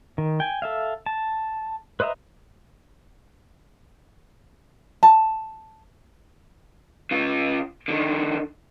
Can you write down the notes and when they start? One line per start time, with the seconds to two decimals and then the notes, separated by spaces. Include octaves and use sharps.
0.18 D#3
0.40 G5 G#5
0.62 A4 E5 F5
1.06 A5
2.00 B4 C5 D#5 E5 A#5
5.03 A5
7.11 C#3 F4
7.88 D3 D#3